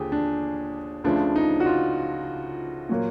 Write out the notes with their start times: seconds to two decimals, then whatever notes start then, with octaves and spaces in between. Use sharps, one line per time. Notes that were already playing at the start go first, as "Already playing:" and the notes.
Already playing: D#2 D3 F3 G4 G#4
0.12 D4
1.04 C#2 C#3 F3 A3 D4
1.36 D#4
1.60 F#4
1.66 F4
2.89 A#2 F#3 A#3